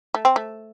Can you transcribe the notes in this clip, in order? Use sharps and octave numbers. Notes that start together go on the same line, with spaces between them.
A3
C4
A3